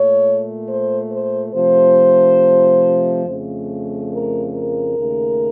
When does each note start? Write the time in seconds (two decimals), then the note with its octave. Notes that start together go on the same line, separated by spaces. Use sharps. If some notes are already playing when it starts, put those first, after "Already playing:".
Already playing: A#2 A3 C#5
0.68 C5
1.12 C5
1.54 C3 F3 A3 C5
3.26 F2 C#3 A3
4.12 A#4
4.55 A#4
4.98 D#2 C#3 A3